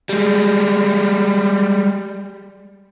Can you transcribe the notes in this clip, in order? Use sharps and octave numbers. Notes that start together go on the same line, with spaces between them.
G3 G#3